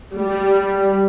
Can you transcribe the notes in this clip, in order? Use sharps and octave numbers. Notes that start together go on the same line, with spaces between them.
G3